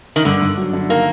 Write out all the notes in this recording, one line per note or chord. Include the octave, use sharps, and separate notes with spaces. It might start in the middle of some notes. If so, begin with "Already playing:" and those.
D#3
G2 D3
G2
F#3
D3
D#3 A#3